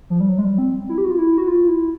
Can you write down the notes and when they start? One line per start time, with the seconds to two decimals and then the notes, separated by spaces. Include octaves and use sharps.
0.10 F3
0.20 G3
0.29 F#3
0.38 G#3
0.45 G3
0.58 C4
0.89 E4
0.98 G4
1.04 F#4
1.11 F4
1.18 E4
1.38 F#4
1.48 F4
1.68 E4